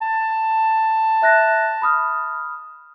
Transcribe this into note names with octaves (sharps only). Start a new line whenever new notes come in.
A5
E5 F#6 A#6
B5 D#6 F6